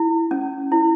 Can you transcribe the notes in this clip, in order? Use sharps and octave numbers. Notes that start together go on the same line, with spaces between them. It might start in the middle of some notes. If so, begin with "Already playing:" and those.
Already playing: E4
C#4
E4